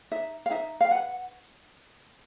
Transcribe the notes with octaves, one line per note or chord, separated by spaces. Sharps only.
D#4 E5
F5
D#4 E5
F5
B4 F#5